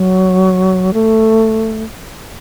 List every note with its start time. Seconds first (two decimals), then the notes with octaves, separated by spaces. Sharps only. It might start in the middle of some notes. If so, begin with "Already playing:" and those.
Already playing: F#3
0.94 A3